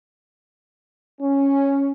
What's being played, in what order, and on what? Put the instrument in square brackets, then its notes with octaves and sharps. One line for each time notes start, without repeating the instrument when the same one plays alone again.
[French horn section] C#4